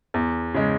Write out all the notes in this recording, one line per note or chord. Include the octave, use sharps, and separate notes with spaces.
E2
C#3 G#3